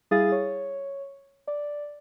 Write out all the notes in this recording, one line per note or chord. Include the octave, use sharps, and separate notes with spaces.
G3 E4 G#4 F5 D#6 A6
C#5
D5